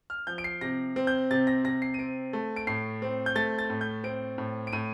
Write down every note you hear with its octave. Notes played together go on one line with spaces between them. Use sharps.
F6
F3 G6
D7
C7
C3 A#6
C4
G6
C3 A6
A#6
C3 A#6
C7
D#7
C4 D7
A3
D7
A2 C7
C4
G6
A3 A6
A6
A2
G6
C4 D7
A2
D7
A2 D#7